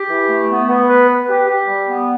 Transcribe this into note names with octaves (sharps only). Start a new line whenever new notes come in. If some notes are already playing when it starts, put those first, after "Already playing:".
Already playing: G4
E3
A3
B3
B3
B4
B4
G4
G4
G3
B3